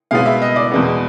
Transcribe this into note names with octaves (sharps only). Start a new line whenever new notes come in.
B2 G#3 B3 F5
E5
D#5
D5
E2 B2 G#3 B3